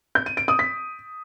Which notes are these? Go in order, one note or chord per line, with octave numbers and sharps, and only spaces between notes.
G6
D#7
D7
D#6
B6